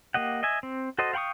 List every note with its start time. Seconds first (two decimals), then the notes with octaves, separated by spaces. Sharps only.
0.14 A#3 G4 D#5 F#5
0.43 D#5 E5 G#5
0.63 C4
0.98 F#4 A4 C5 D#5
1.13 F5 G5 B5 C#6 D#6